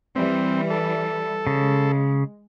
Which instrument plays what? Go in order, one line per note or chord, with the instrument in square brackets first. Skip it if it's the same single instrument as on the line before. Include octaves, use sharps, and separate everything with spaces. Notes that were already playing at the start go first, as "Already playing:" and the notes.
[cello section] E3 G3 [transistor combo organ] C4
[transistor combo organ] A4
[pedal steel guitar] C#3 [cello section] G#3